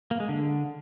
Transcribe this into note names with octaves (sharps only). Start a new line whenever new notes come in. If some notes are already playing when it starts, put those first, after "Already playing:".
A#3
G#3
D3